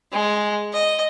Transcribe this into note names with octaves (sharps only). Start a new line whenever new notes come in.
G#3
D#5